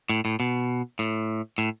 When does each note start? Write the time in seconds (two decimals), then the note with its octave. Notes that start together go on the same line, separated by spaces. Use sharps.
0.10 A2
0.25 A2
0.40 B2
0.99 A2
1.58 A2